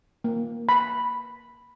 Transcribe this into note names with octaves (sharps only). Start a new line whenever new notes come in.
A#3
B5